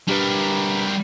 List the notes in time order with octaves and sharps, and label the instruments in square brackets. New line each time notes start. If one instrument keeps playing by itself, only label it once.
[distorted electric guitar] G3 A#4 [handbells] D4 G4 B4